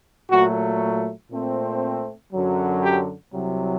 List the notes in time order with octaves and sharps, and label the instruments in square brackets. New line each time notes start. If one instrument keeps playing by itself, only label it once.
[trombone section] A#2 F#3 A3 F#4
A#2 A3 C4
F#2 D3 F#3
G4
C2 C3 F#3